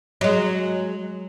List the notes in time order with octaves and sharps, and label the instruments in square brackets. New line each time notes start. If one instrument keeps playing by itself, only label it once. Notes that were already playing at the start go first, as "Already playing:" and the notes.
[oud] F#3 G#3